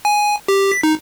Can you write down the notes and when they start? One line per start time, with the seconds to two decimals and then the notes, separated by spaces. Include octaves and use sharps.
0.05 G#5
0.48 G4
0.72 B6
0.83 D#4